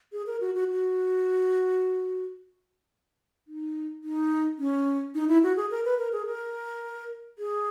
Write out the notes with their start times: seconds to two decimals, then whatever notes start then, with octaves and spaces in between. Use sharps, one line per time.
0.12 G#4
0.27 A#4
0.41 F#4
0.55 F#4
0.68 F#4
3.48 D#4
4.04 D#4
4.59 C#4
5.15 D#4
5.28 E4
5.43 F#4
5.56 G#4
5.71 A#4
5.85 B4
5.98 A#4
6.12 G#4
6.26 A#4
7.39 G#4